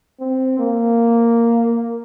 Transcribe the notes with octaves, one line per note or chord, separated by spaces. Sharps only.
C4
A#3